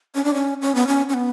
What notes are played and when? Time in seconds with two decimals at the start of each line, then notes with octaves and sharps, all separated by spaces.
0.15 C#4
0.24 D4
0.34 C#4
0.62 C#4
0.75 B3
0.87 C#4
1.09 C#4
1.14 B3